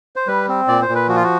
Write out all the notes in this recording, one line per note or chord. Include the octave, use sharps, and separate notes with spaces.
C5
G3 B4
C4
A#2 D5
C5
A#2
B4
F3 F#4
F4
F#4